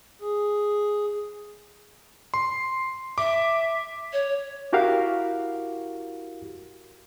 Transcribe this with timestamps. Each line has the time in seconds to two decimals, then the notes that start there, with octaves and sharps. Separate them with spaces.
0.22 G#4
2.34 C6
3.18 E5 D6
4.12 C#5
4.73 E4 F#4 G4 A#4 F5